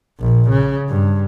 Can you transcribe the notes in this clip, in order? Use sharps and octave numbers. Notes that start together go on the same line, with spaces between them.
A#1
C#3
G2